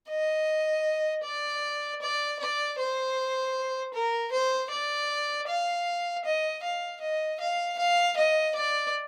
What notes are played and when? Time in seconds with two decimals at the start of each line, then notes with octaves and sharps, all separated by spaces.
0.10 D#5
1.24 D5
2.01 D5
2.39 D5
2.78 C5
3.94 A#4
4.32 C5
4.71 D5
5.47 F5
6.25 D#5
6.63 F5
7.01 D#5
7.40 F5
7.78 F5
8.17 D#5
8.55 D5